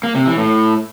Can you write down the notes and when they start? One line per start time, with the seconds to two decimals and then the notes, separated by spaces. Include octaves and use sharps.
0.03 A#3
0.15 C3
0.26 E3
0.37 A2